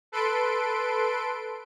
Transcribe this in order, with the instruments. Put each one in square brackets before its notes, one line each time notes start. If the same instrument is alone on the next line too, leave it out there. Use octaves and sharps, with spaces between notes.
[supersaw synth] A4 B4 C6 D7